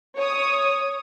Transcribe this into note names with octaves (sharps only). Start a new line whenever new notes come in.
C#5 D#6